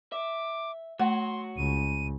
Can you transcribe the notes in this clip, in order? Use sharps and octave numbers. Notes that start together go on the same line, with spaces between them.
E5 D6
A3 F#4 C#5 F#5 C6
C#2 D#7